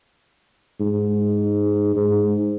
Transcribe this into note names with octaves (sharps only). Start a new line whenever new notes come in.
G#2
G#2